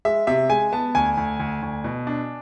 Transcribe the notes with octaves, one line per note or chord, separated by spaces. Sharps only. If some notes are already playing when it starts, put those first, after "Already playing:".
G#3 E5
C3 E5
G#3 G#5
B3 A5
D2 G#5
D2
D2
D2
B2
D4